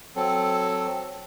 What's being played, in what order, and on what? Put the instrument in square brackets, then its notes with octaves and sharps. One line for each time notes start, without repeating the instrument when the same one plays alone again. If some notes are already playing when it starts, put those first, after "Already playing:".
[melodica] F#3 C4 A4